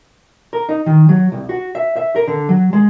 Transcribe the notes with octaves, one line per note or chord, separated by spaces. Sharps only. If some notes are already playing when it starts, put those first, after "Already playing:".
A#4
D#4
D#3
F#3
C2
F#4
E5
E5
A#4
D3
F#3
G#3